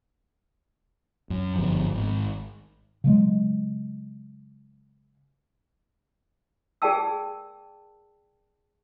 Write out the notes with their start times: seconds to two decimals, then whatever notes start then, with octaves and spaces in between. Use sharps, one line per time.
1.30 F#2
1.56 G1 F3
1.94 G#1
3.04 C#3 F#3 G#3
6.82 G#4 A#4 D5 G5 A5 E6